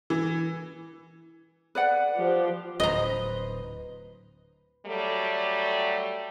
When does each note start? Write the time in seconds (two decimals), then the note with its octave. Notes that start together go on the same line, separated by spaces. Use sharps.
0.10 E3
1.75 B4 D5 F#5
2.17 F3 G4
2.80 D1 B4 C5 D#5 A#5
4.86 F#3 G3 A3